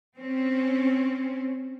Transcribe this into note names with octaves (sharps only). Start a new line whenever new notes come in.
C4 C#4